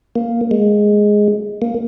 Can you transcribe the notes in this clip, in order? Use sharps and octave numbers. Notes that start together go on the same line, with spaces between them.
A#3
G#3
A#3